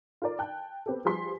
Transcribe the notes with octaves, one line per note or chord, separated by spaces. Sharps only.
F4 A4 A#4 D5
G5 A5 F#6
B3 C4 G4 A4
F3 G3 G#4 B4 C6 B6